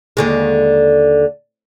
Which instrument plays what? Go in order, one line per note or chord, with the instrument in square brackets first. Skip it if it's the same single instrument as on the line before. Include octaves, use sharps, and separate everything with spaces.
[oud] D#2 D3 G#3